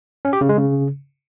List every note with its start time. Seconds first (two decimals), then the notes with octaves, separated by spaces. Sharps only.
0.25 C#4
0.33 G4
0.41 C#3
0.49 G#3
0.57 C#3